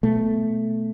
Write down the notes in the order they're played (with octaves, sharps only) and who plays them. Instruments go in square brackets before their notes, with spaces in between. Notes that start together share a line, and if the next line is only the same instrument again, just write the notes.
[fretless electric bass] B2 A3